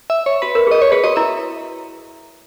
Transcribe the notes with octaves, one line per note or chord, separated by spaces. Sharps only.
E5
C#5
F#4 B4
A#4
G#4 D#5
C#5
G#4 B4
F#4 D#5
E4 E5